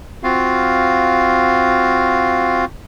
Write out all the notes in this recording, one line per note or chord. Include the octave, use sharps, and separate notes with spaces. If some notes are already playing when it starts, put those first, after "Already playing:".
C4 F4 F#4 F5